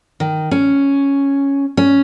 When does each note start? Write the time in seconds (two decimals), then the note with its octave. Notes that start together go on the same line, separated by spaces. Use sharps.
0.20 D#3
0.51 C#4
1.77 C#4